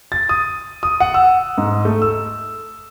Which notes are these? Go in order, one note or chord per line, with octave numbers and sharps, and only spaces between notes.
A6
D#6
D#6
F#5
E6
G#2
A3
E6